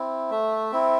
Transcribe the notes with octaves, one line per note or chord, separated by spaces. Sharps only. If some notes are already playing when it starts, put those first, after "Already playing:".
Already playing: C4 E4
A3 E5
C4 E4